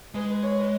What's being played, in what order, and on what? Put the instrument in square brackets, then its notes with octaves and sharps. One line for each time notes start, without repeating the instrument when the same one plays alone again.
[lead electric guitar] G#3 [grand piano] B4
[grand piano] B4
C#5
B4